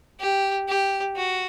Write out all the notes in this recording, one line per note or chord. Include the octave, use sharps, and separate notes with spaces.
G4
G4
F#4